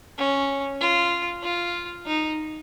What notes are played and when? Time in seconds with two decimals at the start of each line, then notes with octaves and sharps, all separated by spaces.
0.18 C#4
0.80 F4
1.43 F4
2.06 D#4